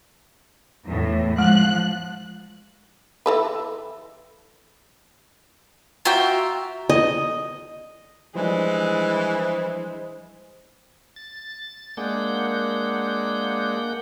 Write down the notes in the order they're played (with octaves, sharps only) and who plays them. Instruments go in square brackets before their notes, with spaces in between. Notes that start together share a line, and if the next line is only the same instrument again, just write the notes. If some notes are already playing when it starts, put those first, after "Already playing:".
[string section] E2 A2
[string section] F3 F#6 [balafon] G#3
[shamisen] E3 A4 B4
[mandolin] F4 E5 G5 [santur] F#4 A#5
[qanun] D#5
[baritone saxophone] E3 [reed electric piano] F3 G3 D4 [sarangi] G#3 [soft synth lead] C5
[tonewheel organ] A6
[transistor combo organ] G#3 D4 [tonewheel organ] A#3 F#5 G6